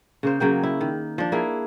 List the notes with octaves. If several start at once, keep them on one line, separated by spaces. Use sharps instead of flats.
C#3 A#3 C5
C#3 F#3 A#3 G5
E4
D#3
F3 D4
A#3 E4 G#4